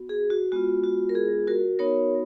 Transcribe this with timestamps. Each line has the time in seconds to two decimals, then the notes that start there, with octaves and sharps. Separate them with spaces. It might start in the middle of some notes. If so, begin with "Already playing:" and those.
Already playing: B3 F#4
0.09 G#4
0.30 F#4
0.52 G#3 B3 F4 F#4
0.84 F#4
1.09 A#4
1.15 G#4
1.47 F#4 A#4
1.79 B3 D#4 F#4 A#4 C#5